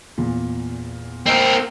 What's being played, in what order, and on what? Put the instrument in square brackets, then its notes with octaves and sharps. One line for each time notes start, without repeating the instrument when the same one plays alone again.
[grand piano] E2 A#2
[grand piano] A#3 D#5 [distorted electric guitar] C4 A#4